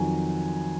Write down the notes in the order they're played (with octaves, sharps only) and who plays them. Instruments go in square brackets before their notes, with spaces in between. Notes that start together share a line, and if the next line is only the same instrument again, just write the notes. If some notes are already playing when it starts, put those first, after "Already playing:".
Already playing: [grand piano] F2 D#3 F#3 G#5